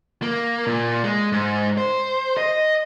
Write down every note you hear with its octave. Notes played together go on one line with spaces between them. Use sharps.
A#3
A#2
G#3
G#2
C5
D#5